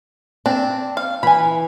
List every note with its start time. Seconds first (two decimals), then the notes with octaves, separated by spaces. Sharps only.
0.46 C4 D4
0.97 F5
1.23 E3 G#5 B5